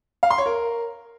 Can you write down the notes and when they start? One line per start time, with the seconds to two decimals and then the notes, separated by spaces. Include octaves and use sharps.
0.23 F5
0.30 C6
0.38 C#5
0.46 A#4